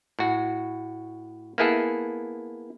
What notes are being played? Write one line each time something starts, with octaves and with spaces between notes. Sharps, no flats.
A2 F#4
A#3 B3 E4 G#4 A4